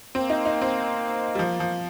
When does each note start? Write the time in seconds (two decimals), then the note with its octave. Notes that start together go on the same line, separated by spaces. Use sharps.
0.14 A#3 C4
0.30 D#4
0.45 D#4
0.61 C4
1.35 G3
1.39 F3
1.60 F3